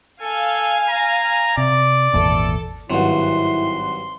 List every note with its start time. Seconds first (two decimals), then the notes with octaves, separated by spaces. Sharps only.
0.22 A4 F5 G#5
0.90 A#5
1.57 C3 D5
2.14 G#1 E2 A#2 A4
2.90 G#1 G2 F#3 E4 F#5 C6